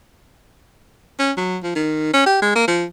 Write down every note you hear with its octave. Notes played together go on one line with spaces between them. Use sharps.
C#4
F#3
F3
D#3
C#4
G4
G#3
A#3
F3